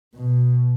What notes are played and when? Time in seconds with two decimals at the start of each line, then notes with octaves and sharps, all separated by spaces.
0.15 B2